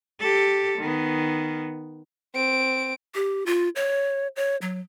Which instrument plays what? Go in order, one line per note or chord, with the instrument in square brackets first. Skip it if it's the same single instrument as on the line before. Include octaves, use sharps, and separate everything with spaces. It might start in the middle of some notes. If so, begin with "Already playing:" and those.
[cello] G4 A4
D#3 B3
[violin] C4 D7
[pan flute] G4
F4
C#5
C#5
F#3